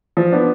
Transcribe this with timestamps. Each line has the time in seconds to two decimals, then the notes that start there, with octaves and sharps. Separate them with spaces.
0.17 F3
0.32 B3 D4